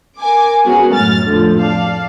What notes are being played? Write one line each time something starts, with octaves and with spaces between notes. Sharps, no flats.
A#4 G#5 D6
B3 C#4 F#4 G#4 A#4
F#2 A2 F6 A6
F2 A2 D3 F3
D5 F5 A5